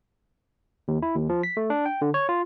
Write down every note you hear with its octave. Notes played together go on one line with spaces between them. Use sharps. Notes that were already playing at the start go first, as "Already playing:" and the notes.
D#2
E4
D#2
F3
B6
A3
D4
G5
D3
C#5
F4